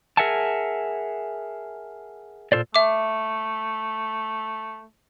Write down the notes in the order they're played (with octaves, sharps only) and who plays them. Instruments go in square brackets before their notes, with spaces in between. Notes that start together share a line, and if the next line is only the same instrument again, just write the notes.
[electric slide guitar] G#4 A#4 E5 F#5 G#5 A5
A#2 F4 A4 C5 D5
[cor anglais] A3 [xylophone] E5 D6